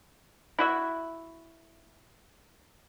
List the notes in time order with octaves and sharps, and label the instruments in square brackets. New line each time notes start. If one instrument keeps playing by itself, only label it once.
[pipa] E4 F#4 E5